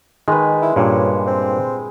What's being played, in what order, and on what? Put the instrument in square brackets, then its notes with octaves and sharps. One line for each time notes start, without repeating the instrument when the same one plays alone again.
[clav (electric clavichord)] D#3 [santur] G#3 B4
[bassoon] E4
[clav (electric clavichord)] G2 A#2 [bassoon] C#4
[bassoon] C4